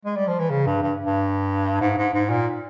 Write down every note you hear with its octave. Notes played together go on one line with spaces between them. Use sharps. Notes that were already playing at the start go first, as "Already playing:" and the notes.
G#3
G3
F3
E3
C#3
G2
G2
G2
G#2
G#2
G#2
A#2